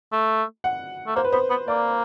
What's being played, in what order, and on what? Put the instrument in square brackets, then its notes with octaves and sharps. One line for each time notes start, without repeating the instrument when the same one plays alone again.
[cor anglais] A3
[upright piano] F#5
[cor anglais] A3
[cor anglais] A#3 [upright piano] C5
[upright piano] B4
[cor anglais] B3 [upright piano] C5
[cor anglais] B3
[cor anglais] A#3 [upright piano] D5